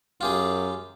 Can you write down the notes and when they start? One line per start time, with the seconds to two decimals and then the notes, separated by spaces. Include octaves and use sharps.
0.21 F#2 F4 G4 G#4